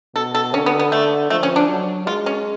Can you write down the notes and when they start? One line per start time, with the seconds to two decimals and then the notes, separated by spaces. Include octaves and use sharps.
0.15 B2 A4
0.35 A4
0.53 D3 C#4
0.66 B3
0.79 B3
0.92 A3
1.30 F3 A3
1.43 C#4
1.56 D4
1.68 F#3
2.07 G#3 F4
2.26 C#4